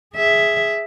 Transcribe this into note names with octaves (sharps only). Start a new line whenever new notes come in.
G#4 E5